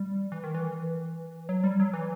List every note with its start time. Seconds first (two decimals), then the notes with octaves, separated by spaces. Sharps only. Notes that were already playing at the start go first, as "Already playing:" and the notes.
Already playing: G3
0.32 E3
0.44 D#3
0.55 E3
1.49 F#3
1.64 G3
1.80 F#3
1.93 E3